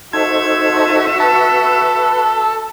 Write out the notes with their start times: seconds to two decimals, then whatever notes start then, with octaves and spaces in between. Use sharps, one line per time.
0.13 D#4 F#4 A4 C5 E5 G#6
1.20 A4 B4